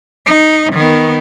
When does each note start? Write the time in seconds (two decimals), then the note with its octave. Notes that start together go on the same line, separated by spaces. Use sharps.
0.26 D#4
0.73 D#3 B3